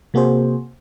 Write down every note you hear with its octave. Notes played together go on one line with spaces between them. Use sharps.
C3 A#3 F#4 G#4 C5